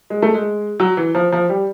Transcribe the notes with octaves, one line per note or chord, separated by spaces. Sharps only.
G#3
A3
G#3
F#3
E3
F3
F3
G3